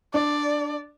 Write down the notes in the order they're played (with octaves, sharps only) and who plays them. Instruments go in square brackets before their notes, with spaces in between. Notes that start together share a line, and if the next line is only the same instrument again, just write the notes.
[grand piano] D4 [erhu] D5